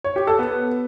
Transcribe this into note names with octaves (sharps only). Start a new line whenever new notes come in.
C#5
G4
A4
B3